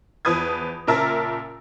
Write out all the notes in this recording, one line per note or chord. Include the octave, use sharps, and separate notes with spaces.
E2 F3 B4 D#6 G#6
A#2 C#3 A#4 E5 A5 E6